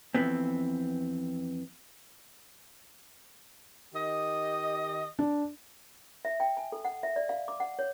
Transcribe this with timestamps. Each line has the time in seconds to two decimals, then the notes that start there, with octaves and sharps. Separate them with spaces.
0.15 F2 G#2 E3 B3 C4
3.95 D#3 G4 D#5
5.19 D4
6.25 E5
6.40 G5
6.57 G#5
6.72 A4
6.85 F#5
7.03 E5
7.16 D5
7.29 F5
7.48 D6
7.60 F#5
7.79 C#5